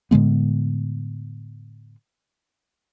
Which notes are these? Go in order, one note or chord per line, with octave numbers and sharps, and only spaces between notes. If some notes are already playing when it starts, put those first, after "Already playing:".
A2 D3 G#3 B3